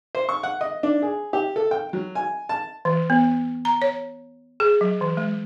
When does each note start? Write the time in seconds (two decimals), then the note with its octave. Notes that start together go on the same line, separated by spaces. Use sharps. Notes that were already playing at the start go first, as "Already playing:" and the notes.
0.15 C5
0.29 C#6
0.43 F#5
0.61 D#5
0.83 D4
1.02 G#4
1.33 G4
1.56 A4
1.71 G5
1.93 F#3
2.15 G#5
2.49 A5
2.85 E3
3.10 B3
3.65 A#5
3.82 C#5
4.60 G#4
4.81 F#3
5.01 E3
5.17 G#3